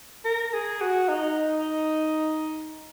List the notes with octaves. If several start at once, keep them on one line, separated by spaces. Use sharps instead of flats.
A#4
G#4
F#4
D#4